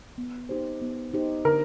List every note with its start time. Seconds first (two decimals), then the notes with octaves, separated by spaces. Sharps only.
0.18 B3
0.49 D#4 G4 C5
0.82 B3
1.13 D#4 G4 C5
1.45 D3 A#4